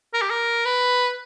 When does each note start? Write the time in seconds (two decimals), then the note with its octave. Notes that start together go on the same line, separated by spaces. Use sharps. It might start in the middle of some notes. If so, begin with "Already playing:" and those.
0.14 A#4
0.21 G4
0.30 A#4
0.65 B4